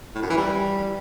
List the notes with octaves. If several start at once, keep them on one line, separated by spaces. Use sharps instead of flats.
A2
F#2
E3
G3